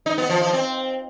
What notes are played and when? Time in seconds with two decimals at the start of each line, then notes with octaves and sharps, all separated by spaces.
0.06 D#4
0.18 B3
0.30 F3
0.41 F3
0.53 C4